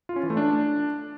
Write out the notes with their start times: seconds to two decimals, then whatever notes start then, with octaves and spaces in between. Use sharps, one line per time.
0.09 F4
0.16 C#4
0.23 E3
0.30 A3
0.37 D4